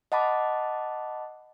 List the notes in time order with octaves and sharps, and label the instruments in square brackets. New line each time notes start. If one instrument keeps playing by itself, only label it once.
[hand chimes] D#5 F#5 A5 B5 D6